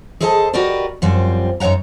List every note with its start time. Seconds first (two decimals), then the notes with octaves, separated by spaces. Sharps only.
0.20 G#4 A4 C5 D#5 E5 A5
0.53 F#4 G4 A#4 B4 D5 D#5
1.02 F#2 F3 G3 C4
1.60 F#2 D#4 C#5 F#5 A#5